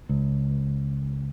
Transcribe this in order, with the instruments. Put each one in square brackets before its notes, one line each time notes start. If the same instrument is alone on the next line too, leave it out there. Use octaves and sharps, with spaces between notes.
[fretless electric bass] C#2